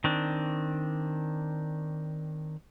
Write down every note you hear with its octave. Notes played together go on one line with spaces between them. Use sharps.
D#3 C4 D4